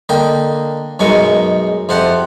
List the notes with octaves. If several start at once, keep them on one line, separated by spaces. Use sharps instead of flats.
D3 A#3 D#5 G5
F#2 B2 G#3 D#4 C#6
F2 C3 C5 F#5 A5